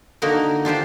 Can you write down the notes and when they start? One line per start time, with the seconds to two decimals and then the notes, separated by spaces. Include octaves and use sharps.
0.22 D3 A#3 D#4 F#4 A#4
0.65 D4 F4 G4 C5